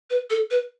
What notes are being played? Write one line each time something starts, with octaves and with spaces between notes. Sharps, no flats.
B4
A4
B4